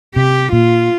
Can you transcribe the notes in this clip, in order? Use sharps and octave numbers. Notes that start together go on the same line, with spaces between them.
C3 G4
A#2 F4